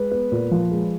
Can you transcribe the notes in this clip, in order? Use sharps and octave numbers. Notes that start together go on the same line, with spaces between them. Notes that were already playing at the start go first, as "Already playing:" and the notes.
Already playing: G#3 B4
B3
A#2
F3
G#3